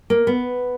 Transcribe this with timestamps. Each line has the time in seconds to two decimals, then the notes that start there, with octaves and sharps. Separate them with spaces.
0.10 A#3
0.27 B3